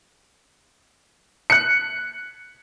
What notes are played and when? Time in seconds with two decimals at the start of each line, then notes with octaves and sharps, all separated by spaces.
1.50 F#6 C#7